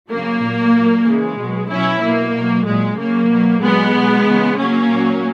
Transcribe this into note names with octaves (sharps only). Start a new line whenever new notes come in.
C#3 F#3 A#3
A#2 F#3
A#2 F#3
C#3 E3 G#3
B2 F#3
B2 F#3 C#4 E4
B2 F#3 A#3
B2 F#3
A#2 F#3 G#3
C#3 F#3 A#3
B2 F#3
A#2 F#3 G#3 B3
B2 F#3
C#3 E3
C#3 F#3 A#3 C#4
A#2 F#3